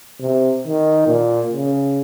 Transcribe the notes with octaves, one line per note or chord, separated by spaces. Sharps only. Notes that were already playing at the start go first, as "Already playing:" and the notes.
C3
D#3
A#2
C#3